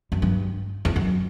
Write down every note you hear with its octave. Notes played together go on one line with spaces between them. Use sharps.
F#2
G2
E2
F#2